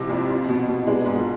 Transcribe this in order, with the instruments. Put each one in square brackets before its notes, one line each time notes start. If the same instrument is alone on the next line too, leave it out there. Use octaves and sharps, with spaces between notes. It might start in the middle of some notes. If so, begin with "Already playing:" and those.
Already playing: [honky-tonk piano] G#2 C3 F3 [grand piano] C4 E4
[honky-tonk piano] F2
F4
B2
B2
[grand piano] E4
[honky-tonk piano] G#3 [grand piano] B3 D4
[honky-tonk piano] G#2 [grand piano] G#4
[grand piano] F4 A4